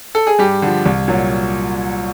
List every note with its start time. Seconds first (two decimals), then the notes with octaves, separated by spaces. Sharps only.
0.15 A4
0.27 G#4
0.39 G2 G4
0.62 D3 F3
0.86 C2
1.08 A#2 F#3